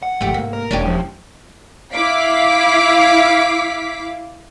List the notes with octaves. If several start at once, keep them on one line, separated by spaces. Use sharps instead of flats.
F#5
G#1 F3 A3 G4
G#2 C3 A#3
A#4
E1 C#4 D4 G4
F3
E4 F5 D6 B6